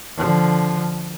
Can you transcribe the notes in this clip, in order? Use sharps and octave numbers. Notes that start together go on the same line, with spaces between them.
D3 F3